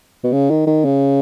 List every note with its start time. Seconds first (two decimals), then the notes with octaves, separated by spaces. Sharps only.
0.24 B2
0.32 C#3
0.50 D#3
0.67 D#3
0.85 C#3